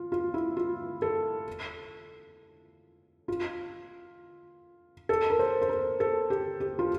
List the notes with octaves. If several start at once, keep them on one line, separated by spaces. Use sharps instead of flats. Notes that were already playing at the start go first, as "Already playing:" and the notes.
Already playing: F4
F4
E4
F4
A4
F4
A4
A#4
C5
C5
A#4
A4
G4
G4
F4